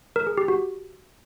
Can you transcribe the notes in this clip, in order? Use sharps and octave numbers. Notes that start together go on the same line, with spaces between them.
A#4
G#4
G4
F#4